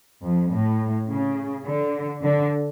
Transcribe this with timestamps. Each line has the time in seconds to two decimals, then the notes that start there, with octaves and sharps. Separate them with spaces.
0.22 F2
0.50 A2
1.08 C#3
1.65 D3
2.22 D3